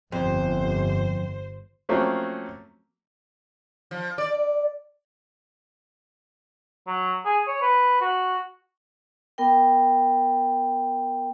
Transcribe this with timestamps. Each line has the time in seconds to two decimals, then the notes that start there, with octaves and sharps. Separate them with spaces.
0.12 G1 F2 C5
1.89 F3 F#3 A3 A#3 C4 C#4
3.91 F3
4.18 D5
6.88 F#3
7.25 G#4
7.47 C#5
7.62 B4
8.01 F#4
9.38 B3 A#4 G5